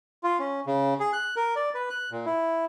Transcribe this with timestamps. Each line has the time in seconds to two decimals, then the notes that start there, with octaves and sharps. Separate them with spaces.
0.23 F4
0.39 C#4
0.66 C#3
1.00 G#4
1.13 F#6
1.36 A#4
1.56 D5
1.74 B4
1.90 F#6
2.11 A#2
2.26 E4